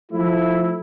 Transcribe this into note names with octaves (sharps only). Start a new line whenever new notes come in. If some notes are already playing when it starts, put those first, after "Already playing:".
F3 A3 E4